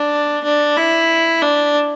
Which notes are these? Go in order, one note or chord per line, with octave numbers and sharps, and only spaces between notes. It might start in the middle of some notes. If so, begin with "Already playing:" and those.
Already playing: D4
D4
E4
D4